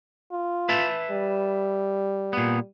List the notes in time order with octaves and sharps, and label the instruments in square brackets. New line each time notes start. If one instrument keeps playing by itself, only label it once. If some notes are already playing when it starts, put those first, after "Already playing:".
[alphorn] F4
[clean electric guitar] B4 E5 A5
[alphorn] G3
[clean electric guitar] A#2 B3